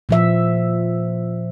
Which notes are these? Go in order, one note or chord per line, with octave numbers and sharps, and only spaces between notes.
A#2 F3 E5